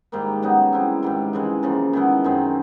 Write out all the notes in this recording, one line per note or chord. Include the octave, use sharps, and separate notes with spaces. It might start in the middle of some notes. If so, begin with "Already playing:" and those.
G#2 D#3 G3 A#3
C#3 F#3 B3 D#4
G3 C4 E4
G#2 D#3 G3
C#3 E3 G#3
C#3 F3 A#3
D#3 G#3 B3 E4
F#2 D#3 G#3 C4